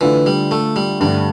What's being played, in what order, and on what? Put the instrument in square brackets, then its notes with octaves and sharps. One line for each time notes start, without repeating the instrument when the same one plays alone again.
[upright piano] D3 A3 D4 F4 [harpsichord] E3
[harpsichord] G3
A3
G3
[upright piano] G2 D3 A3 D4 [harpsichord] G3